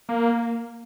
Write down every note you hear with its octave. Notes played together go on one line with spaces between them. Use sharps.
A#3